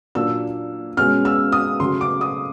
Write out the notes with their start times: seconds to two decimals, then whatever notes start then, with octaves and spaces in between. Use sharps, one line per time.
0.15 A#2 F#3 A#3 D4 E6
0.97 B2 G#3 C#4 F6
1.25 E6
1.52 D#6
1.80 C#3 F#3 A3 C6
2.01 D6
2.21 D#6